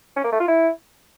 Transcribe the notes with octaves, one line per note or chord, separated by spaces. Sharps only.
C#4
A#3
A3
F4
E4